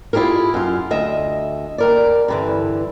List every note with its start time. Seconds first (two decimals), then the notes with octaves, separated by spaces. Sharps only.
0.13 E4 F4 G4 G#4 A#4
0.54 F#2 F4
0.91 D2 D#5 E5
1.78 D#2 A#4 D5
2.28 G2 D3 E3